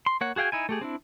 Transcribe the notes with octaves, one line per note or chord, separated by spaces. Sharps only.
C6
A#3 C#5 F#5
F#4 G#4 F5 G5 G#5
D#4 E4 G#5
A3 G4 G#4
C4 D4 E4